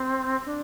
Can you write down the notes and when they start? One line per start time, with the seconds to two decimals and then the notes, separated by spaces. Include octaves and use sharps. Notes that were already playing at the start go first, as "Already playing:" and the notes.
Already playing: C4
0.46 D4